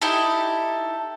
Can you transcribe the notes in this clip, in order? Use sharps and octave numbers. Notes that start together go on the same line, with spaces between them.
D#4 E4 G4 A4